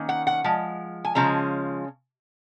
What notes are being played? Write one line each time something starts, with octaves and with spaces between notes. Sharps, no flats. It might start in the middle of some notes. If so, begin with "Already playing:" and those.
Already playing: D#3 A#3 C#4
F#5
F#5
F3 G#3
G#5
C#3 F3 G#3 C#4 A#5